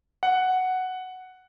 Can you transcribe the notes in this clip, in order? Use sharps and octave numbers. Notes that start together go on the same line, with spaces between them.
F#5